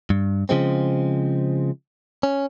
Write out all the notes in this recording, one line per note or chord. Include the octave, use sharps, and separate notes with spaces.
G2
C#3 F3 G#3 C4
C#4